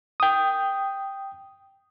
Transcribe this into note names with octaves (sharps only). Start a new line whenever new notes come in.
G5 D#6